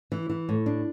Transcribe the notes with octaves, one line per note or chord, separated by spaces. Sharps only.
E3
E3
A2
D4